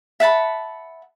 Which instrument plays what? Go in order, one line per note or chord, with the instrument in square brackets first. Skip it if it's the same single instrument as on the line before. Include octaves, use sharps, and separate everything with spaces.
[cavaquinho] E5 F#5 A5 B5